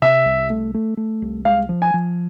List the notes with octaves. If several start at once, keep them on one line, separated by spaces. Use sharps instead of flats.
C3 E5
C2
A3
A3
A3
C2
G#3 F5
F3
G#5
F3